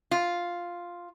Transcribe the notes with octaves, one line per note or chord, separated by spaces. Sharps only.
F4